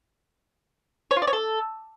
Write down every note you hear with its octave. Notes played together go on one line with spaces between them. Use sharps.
C#5
F4
D5
C#5
A4